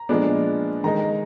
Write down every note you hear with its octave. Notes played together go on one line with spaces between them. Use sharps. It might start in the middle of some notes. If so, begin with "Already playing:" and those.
Already playing: A#5
A#2 F3 G#3 B3 D4
D#3 G#3 D#4 A#5